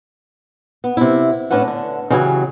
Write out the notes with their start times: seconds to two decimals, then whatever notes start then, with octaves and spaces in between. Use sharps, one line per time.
0.84 B3
0.97 C3 E4
1.50 A2 C#4 D4 B4 F#5
1.68 D3
2.10 C#3 E3 F#3 G4 F#5 G#5